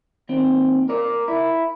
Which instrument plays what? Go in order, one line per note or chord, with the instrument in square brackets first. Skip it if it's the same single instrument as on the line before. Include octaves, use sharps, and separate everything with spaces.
[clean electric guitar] D#2 C4
A#4 D5
E4